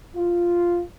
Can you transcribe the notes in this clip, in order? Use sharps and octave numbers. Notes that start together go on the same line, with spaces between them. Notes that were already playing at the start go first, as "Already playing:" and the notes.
F4